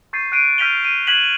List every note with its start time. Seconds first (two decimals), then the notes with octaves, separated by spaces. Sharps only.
0.13 C#6 G6 A6 C7 D#7
0.32 F#6 C7 D7 D#7
0.58 F6 G6 B6 D#7 F7 G7
0.84 D#7
1.07 F#6 G#6 B6 E7 F#7